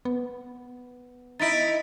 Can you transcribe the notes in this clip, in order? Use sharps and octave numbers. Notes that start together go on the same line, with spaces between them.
B3
D#4 E4 A6 B6 D7